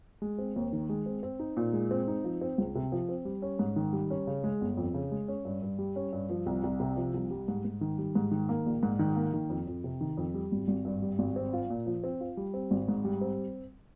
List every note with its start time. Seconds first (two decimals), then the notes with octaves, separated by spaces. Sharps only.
0.22 G#3
0.39 C4
0.56 D#2
0.73 D#3
0.89 G#3
1.06 C4
1.23 C4
1.39 D#4
1.57 A#2
1.73 G#3
1.91 C4
2.08 D#4
2.24 F3
2.41 C4
2.58 C#2
2.75 C3
2.92 F3
3.09 C4
3.25 G3
3.42 C#4
3.59 G#2
3.76 D#3
3.93 G3
4.10 C#4
4.27 C#3
4.44 G#3
4.61 G1
4.77 F2
4.94 C#3
5.12 G#3
5.28 C#4
5.45 G2
5.62 G2
5.79 G3
5.96 C#4
6.13 G2
6.30 F3
6.46 C2
6.63 C2
6.80 C3
6.96 F3
7.14 C2
7.30 G3
7.48 G#2
7.65 G#2
7.81 D#3
7.98 G3
8.15 G#2
8.31 D#3
8.49 A#3
8.66 A#1
8.83 G#2
8.99 D#3
9.16 A#3
9.34 D#3
9.50 F2
9.67 F2
9.84 C3
10.01 D#3
10.17 F2
10.34 G3
10.52 G#1
10.68 G#1
10.85 G2
11.02 G3
11.19 G#1
11.36 C4
11.53 F4
11.70 A#2
11.86 F3
12.04 C4
12.21 F4
12.37 G3
12.54 C4
12.71 G#1
12.88 G#2
13.05 G3
13.21 C4